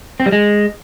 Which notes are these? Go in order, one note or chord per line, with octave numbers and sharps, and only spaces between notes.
C4
G3
G#3